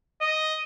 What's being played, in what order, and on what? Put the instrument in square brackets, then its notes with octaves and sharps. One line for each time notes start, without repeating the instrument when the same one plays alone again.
[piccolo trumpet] D#5